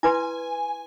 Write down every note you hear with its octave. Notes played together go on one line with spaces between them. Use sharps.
E4 B4 G#5 C6